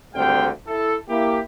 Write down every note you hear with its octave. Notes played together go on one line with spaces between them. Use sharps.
G#1 D2 G3 C4 F5 G5
E4 A4
A#3 E4 G4